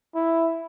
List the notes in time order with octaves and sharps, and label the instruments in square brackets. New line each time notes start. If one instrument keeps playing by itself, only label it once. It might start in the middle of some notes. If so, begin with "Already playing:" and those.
[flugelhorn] E4